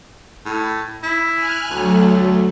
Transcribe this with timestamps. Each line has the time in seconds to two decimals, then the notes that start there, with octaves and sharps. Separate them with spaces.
0.45 A2
1.03 E4
1.34 G#5 F6 F#6
1.71 D2 F#3 A3